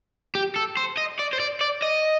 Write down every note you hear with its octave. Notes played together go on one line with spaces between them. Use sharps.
G4
A4
C5
D#5
D5
C5
D5
D5
D#5